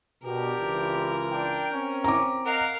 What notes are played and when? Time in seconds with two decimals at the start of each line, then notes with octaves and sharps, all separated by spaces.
0.24 B2 D4 G4 A#4
0.60 C#2 E3 F4
1.32 D4 G5
1.72 C4 C#4
2.04 A#5 D6
2.46 A#4 D#5 F5 F#5